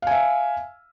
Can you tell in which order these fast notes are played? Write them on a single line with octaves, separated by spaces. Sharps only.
F5 G#5 E5